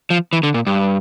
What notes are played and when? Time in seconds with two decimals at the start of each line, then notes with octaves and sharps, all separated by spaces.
0.10 F3
0.33 E3
0.43 D3
0.54 A#2
0.67 G2